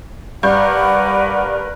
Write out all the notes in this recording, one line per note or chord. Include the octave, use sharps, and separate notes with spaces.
G2 A#4 B4 D5 F#5 G6